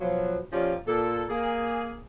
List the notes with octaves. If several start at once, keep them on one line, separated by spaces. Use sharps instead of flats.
B2 F3 F#3
A#2 F3 C#4 F4 G4 D5
A#2 A4
A#3 G#4